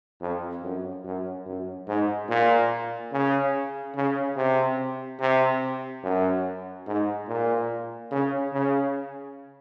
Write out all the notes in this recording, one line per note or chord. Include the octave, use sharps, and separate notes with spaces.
F2
F#2
F#2
F#2
G#2
A#2
C#3
C#3
C3
C3
F#2
G#2
A#2
C#3
C#3